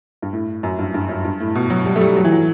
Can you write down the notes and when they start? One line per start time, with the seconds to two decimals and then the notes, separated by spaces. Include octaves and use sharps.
0.22 G2
0.33 A2
0.63 F#2
0.79 G2
0.94 G2
1.09 F#2
1.24 G2
1.40 A2
1.55 B2
1.70 F#3
1.86 G3
1.96 A3
2.01 G3
2.17 F#3
2.24 E3
2.32 F#3